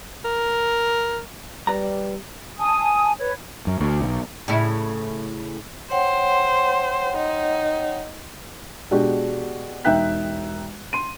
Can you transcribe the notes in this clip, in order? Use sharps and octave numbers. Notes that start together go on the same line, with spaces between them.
A#4
G3 B4 D5 A#5
G#5 A5 D#6
B4 C#5
F#2
D2
B1
A2 C#3 E4
C5 C#5 F#5 G5
D#4
B2 G#3 D4 F#4 G4
E1 D#4 E5 G5 F#6 B6
C6 D#7